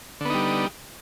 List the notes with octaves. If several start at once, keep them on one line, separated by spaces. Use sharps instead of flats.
D3 G3 B3 D#4